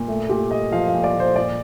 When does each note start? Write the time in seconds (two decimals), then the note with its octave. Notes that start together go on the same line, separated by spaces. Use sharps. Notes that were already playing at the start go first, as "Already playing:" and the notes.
Already playing: A#2
0.08 A3
0.29 A#2 G4
0.51 A#2 D#5
0.72 F3 F5
0.88 F5
0.93 A#2
1.04 D5
1.14 A#2
1.20 C5
1.36 A#2 D5